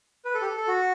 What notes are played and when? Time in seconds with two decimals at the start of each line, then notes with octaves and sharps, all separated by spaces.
0.25 B4
0.35 A4
0.41 G4
0.45 A4
0.57 A4
0.68 F#4